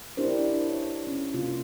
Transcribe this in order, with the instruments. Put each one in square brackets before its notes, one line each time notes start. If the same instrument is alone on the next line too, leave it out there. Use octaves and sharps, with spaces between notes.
[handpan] D4 E4 G4 A#4 C5
C#5
C#4
C3 A#3 F4